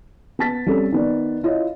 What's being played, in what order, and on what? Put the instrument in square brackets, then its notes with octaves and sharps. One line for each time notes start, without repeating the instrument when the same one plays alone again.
[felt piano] B3 A5 A6 B6
G3 C4 C#4 A4
D#3 B3 D5
E4 F4 C#5 D#5